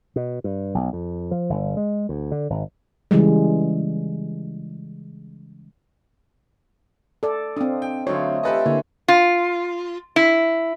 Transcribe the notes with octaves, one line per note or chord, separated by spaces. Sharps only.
B2
G2
B1
F2
F3
G1
G#3
D2
D3
G#1
C#3 E3 G3 G#3
A4 D5
C4 D4 D#5 F5
G5
D3 F#3 A3 C4 D#4 F4 C#5
E3 G4 A4 B4 D#5 C6
D3 A#3 E4 C5 C#5
F4
E4